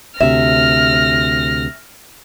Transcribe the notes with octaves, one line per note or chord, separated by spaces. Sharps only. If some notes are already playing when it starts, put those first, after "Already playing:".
D2 C3 E5 F6 A#6